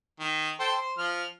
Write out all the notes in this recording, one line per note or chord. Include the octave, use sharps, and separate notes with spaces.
D#3
A4 C5 G5
C5
F3 F6